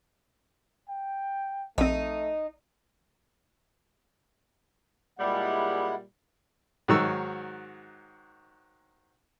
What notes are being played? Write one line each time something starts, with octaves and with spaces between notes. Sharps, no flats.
G5
A#1 A3 C4 D#4
A#2 G3 G#3 E4 F#5
G#2 D#3 F#3 F#4 C#5 E6